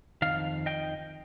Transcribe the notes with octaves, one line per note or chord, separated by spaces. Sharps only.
F2 D#3 F5
D#5 G5